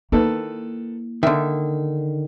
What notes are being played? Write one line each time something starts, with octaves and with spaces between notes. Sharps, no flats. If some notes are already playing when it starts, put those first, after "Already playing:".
D#3 A#3 E4 A4 B4
D3 D#3 E5